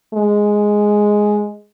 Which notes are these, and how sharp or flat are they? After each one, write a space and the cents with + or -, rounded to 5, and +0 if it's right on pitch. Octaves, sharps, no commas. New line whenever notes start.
G#3 +0